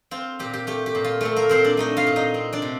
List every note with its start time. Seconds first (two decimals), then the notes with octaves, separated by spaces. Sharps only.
0.11 C4 F4
0.39 A#2 G4
0.53 G4
0.67 A3 G4
0.86 G4
0.95 A#2
1.04 F4
1.21 A3 C4 A4
1.37 A#3 A#4
1.49 A#2 C4 C5
1.64 D4 D5
1.77 A3 D#4 D#5
1.97 F4 F5
2.07 A#2
2.16 D#4 D#5
2.34 C4
2.53 D4 D5
2.62 C3